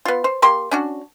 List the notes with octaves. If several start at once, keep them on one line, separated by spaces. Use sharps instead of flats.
B3 F4
C5
A#3 G4 C6
C#4 D4 F#4